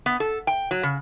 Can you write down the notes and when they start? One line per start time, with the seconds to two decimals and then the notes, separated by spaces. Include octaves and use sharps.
0.06 B3
0.20 A4
0.47 G5
0.71 F#3
0.83 C#3